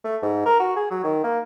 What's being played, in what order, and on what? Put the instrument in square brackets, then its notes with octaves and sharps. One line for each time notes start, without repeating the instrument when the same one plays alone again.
[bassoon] A3
G#2
A#4
F#4
G#4
F#3
D#3
A#3